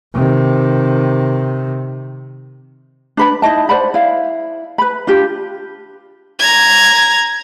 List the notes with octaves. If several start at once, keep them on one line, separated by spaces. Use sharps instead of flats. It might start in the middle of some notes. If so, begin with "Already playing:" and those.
C3 D#3
D4 B4 B5
D#4 E4 D#5 A5
C5 D5 F#5 B5
E4 F5
B4 B5
D4 F4 G4
A#5 G#6